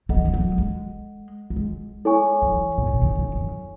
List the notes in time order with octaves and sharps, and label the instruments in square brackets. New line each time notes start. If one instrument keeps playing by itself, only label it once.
[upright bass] E3 [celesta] A4 D#5 F#5
[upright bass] F#3
E3
F#3
G#3
F#3
G#3
[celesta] E4 A4 C#5 G#5 C#6
[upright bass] F#3
E3
B2
A2
B2
D#3
D#3
F#2